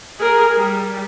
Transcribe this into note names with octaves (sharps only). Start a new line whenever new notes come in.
G#4 A#4
G3